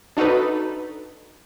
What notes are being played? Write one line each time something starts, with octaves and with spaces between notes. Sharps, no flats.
D4 D#4 F#4 A4 B4